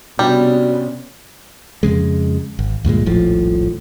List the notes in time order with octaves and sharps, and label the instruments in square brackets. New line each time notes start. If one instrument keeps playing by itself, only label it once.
[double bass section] C3 B3 C#4 [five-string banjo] G3 [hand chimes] D4 F#4 D5
[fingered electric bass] F2 C#3 G#3
G#1
D2 G2 A#2 G#3
D#1 A#1 A2 F3